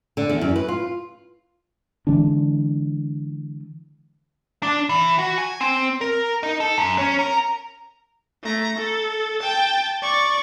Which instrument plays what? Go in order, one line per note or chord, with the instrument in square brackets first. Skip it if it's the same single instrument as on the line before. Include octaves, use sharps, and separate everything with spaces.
[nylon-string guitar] D3
E2
F#2
B4
F4
[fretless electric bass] D3 E3 G#3 D4
[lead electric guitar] D4
E3
F#4
G#5
C4
A#4
D#4
A4
F#2
C#4
A#4
[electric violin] A3 A#5
A4
G5 A5
D5 C#6